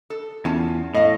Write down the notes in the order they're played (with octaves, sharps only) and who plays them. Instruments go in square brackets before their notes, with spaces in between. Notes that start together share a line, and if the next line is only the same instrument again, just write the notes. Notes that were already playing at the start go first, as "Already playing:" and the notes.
[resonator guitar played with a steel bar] A4
[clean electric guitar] E2 [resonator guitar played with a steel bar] C#4 F4 A5
[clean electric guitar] A2 [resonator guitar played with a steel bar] D#5 F5